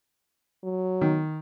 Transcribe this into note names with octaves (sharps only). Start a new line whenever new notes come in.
F#3
D#3